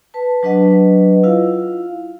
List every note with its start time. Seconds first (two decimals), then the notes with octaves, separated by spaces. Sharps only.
0.14 B4 A5
0.43 F#3 D4 B4 D#5 F#5
1.23 E4 F4 F5